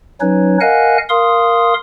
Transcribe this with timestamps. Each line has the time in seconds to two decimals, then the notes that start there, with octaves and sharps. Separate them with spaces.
0.21 F#3 C#4 D#4 B4 C#5
0.61 A#4 D#5 F5 F#5 G#5 F#6
1.09 A#4 F5 C6 D#6